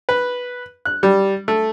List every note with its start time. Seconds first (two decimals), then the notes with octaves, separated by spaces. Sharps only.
0.09 B4
0.85 F#6
1.03 G3
1.48 A3